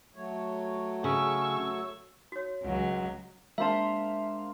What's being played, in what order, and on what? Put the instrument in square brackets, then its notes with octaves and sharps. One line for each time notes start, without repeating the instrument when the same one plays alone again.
[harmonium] F#3 A3 C#5
[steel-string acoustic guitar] C#3 [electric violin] C#6 E6
[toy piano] F#4 C#5
[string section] C#2 [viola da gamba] F#3
[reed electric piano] G#3 D4 [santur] A#3 C5 F5 [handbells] E5 A5